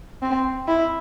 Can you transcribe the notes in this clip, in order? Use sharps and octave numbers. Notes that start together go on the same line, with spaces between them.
C4
E4